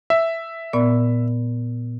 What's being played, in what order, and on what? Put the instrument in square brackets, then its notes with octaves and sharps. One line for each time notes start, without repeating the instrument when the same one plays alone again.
[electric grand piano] E5
[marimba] A#2 B3 D5